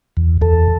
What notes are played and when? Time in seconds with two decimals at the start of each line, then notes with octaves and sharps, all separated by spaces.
0.17 E2
0.41 E2 A4